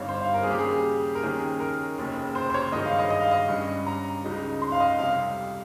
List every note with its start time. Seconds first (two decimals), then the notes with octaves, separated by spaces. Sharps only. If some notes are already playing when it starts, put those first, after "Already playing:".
Already playing: G1 G2 G3 C4 D#4 C#5 F5
0.09 C5
0.21 F5
0.34 A#4
0.43 G#4
0.47 D#2 C#3 G3 G4
0.59 G#4
1.15 A#4
1.22 D#2 D#3 A#3 C#4 G#4
1.60 A#4
1.98 F1 D#2 C#3
2.35 C5
2.50 C5
2.54 C#5
2.72 G2 D#3 G#3 D#4 D#5
2.85 F5
2.99 D#5
3.10 D#5
3.21 F5
3.31 D#5
3.48 G2 G3 C#4
3.87 A#5
4.24 C#2 C#3 G#3 D#4
4.62 C6
4.72 F5
4.80 D#5
4.99 F2 C3 G3 F5